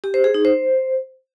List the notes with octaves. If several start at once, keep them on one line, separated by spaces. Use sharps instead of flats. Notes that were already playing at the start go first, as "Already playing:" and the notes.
G4
C5
G#4
D#4
C5